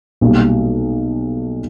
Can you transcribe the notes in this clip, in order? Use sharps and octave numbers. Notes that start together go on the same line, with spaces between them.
B1 A#2 G3